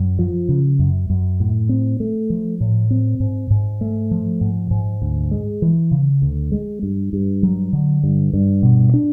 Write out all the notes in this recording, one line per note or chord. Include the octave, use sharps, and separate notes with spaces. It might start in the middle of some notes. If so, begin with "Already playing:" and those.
Already playing: F#2
F3
C#3
F#2
F#2
A2
C4
A3
F3
A2
C4
G#2
G#2
A3
F3
G#2
G#2
D2
G#3
E3
C#3
D2
G#3
G2
G2
F#3
D3
G2
G2
B2
D4